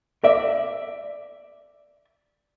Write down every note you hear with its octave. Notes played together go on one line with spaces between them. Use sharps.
D5 E5